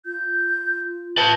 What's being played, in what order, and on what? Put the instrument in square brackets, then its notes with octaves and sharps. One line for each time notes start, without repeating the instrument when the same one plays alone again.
[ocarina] F4 [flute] G6
[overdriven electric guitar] B4 A5 [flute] G6